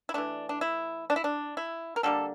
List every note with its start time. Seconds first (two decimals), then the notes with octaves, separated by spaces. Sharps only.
0.09 E4
0.14 E3 A3 D4
0.49 D4
0.61 E4
1.10 D4
1.16 E4
1.24 D4
1.57 E4
1.96 A#4
2.03 D3 G3 A#3 A4